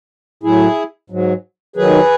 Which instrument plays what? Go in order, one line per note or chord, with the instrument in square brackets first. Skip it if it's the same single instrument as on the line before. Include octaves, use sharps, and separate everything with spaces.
[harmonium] A2 F#3 E4 G#4
G#2 F#3
D#2 D#3 F#3 G#4 B4